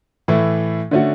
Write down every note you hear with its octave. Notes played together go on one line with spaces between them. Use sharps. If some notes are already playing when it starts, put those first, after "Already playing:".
A2 E3 A3 E4
D3 A3 C#4 F#4